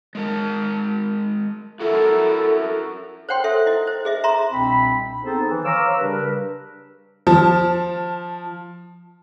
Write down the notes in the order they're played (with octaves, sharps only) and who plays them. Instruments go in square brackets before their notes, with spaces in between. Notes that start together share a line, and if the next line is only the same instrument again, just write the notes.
[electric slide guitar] G#3 A#4 A5
[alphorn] E4 [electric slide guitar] F#4 A#4 E5 [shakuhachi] A4
[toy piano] C5 C#5 F#5 G5 C6
A4 C5 E5
E4 D#5
C5
G#4 D#5 E5
E5 A#5 C6
[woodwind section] C2 B2 C4 D4 B5
B3 C4 D#4 G#4 A4 C5
E3
C5 C#5 F5 A#5 D6 E6
C#3 G3 D4 G4 A#4 B4
[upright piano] F3 A5